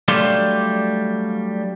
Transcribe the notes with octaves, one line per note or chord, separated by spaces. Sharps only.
F#3 G3 A3 D4 F5 C6